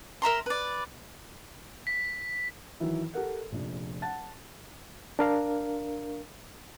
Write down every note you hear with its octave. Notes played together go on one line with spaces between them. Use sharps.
A#4 E5 A#5 C6
B4 D5
B6
D#3 E3 F#3 E4
G4 A4 A#4 F#5
F1 A#1
F#5 A5 A6
D4 A#4 F5